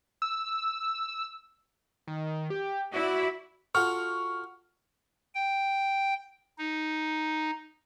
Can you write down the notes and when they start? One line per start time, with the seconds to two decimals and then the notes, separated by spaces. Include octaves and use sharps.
0.22 E6
2.07 D#3
2.50 G4
2.94 E4 F#4 D5
3.75 F4 F#4 A4 C#6 F6
5.35 G5
6.58 D#4